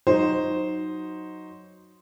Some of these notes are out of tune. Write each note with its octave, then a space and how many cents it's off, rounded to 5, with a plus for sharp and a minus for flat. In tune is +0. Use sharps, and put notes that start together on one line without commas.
F#3 +0 D#4 +0 C5 +0